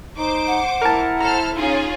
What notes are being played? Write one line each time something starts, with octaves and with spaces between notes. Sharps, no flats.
D#4 C5 D6
F#5
E4 A#4 A5
A4 C5 A#5 F6
C#4 D#4 F4 G#4